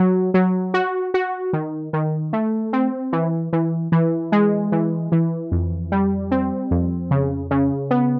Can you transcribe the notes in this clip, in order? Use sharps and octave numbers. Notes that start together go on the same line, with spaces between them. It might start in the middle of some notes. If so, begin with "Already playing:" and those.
Already playing: F#3
F#3
F#4
F#4
D#3
D#3
A3
C4
E3
E3
E3
G#3
E3
E3
F2
G3
C4
F2
C#3
C#3
B3